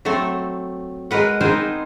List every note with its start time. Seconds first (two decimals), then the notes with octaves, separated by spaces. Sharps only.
0.05 F#3 A3 C4 A4
1.11 G#3 A#4 B4 F#5
1.41 B3 C4 D#4 G#4 A#4 C5